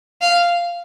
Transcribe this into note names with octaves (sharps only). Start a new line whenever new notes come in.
F5